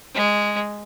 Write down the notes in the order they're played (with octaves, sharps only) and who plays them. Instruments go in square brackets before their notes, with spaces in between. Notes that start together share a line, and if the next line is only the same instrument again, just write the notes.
[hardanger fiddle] G#3